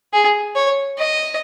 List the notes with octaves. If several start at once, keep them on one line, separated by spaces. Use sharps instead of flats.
G#4
C#5
D#5